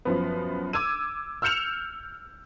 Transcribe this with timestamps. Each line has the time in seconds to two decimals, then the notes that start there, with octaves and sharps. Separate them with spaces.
0.05 F#2 F3 B3
0.73 D6 E6 G#6 D#7
1.42 E6 F6 G6 C#7 E7 F7